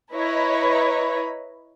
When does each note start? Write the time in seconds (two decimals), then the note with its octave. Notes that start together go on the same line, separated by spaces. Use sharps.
0.13 E4 B4 C#5 D#5 A#5 B5